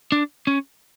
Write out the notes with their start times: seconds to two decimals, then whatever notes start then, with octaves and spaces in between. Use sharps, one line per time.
0.12 D4
0.47 C#4